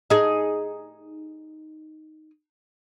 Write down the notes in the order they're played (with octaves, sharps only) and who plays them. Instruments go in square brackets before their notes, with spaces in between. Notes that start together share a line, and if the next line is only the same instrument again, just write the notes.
[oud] D#4 G#4